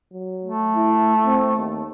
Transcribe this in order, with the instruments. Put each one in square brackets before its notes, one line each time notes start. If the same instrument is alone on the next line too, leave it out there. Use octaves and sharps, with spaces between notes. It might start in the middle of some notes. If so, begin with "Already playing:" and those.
[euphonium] F#3
[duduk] A3
[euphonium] E4
C4
D#2